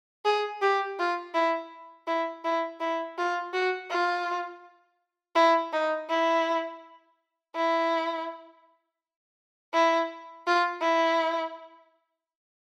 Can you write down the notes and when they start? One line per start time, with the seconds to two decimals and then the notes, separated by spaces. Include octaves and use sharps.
0.25 G#4
0.62 G4
0.99 F4
1.34 E4
2.07 E4
2.44 E4
2.80 E4
3.18 F4
3.53 F#4
3.90 F4
5.35 E4
5.72 D#4
6.09 E4
7.55 E4
9.73 E4
10.47 F4
10.82 E4